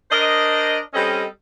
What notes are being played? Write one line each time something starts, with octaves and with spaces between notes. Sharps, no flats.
D4 A#4 C5 D#5
G3 C4 C#4 A4 D#5